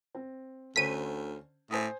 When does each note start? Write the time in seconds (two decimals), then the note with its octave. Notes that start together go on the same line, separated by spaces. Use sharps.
0.15 C4
0.76 D2 D3 C#4 C5 B6 D#7
1.71 A2 C5 G#5 D#6